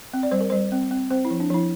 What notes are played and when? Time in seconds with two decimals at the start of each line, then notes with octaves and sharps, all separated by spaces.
0.13 C4
0.23 D5
0.31 G3 C5
0.41 A#4
0.50 G3 C5
0.72 C4
0.91 C4
1.11 C4 C5
1.25 E4
1.31 F3
1.40 D4
1.50 F3 E4